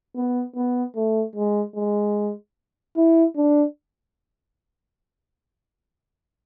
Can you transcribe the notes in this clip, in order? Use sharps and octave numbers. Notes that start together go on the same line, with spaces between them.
B3
B3
A3
G#3
G#3
E4
D4